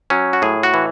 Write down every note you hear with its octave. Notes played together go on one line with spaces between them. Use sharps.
F#3 C#4
F#4
A2 G#4
F#4
E3